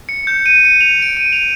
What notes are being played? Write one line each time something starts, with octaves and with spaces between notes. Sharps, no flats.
C#7
G6
D#7
C#7
F7
D7
D#7
F7